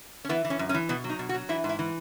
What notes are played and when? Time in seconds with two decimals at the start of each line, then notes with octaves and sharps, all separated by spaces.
0.25 C#4
0.29 E3 B3
0.45 E3
0.50 C#4
0.59 F#2
0.69 C#4
0.74 E3
0.89 B2 B3
1.04 F#3
1.09 D#4
1.19 B2
1.29 F#4
1.34 F#3
1.49 E3 E4
1.64 G#2
1.69 E4
1.79 E3